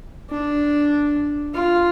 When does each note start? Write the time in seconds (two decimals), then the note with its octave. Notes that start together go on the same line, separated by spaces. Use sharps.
0.30 D4
1.54 F4